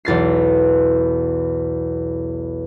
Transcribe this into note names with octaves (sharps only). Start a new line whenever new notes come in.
B1 E2 A6 C7